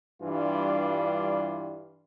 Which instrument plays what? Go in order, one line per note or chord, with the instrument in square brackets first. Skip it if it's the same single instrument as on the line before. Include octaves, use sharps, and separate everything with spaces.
[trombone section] G2 E3 G3 D4 F4